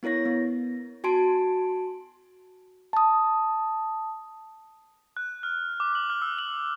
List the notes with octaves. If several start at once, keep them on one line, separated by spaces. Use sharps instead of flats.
B3 E4 A#4 C#5 A#6
B3
F#4 G#5 A5 C6 D7
A5 D#6
F#6
F6
D6
F#7
F6
E6
F#7